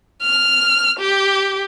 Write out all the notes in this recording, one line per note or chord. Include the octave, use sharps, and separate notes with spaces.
F6
G4